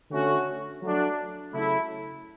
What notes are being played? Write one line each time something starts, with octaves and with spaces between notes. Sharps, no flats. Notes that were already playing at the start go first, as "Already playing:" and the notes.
D3 A3 C#4 F#4
F#3 A3 D4
C#3 F#3 A3 E4